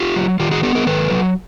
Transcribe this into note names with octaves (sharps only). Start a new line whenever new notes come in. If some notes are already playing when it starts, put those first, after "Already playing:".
Already playing: F4 G4
F#3
D#3 F4 G4
F#4 G#4
B3 G4 A4
G#4 A#4
D#3 A4 B4
F#3